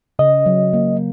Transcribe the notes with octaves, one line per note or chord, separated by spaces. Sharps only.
C#3 D#5
F#3
A#3